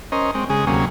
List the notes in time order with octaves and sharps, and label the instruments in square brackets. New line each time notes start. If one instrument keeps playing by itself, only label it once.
[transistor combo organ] C#4 A#4 C5 D#5
G#3 C4
C#3 G#3 G#4
D2 C3 F#3 A#3 C#4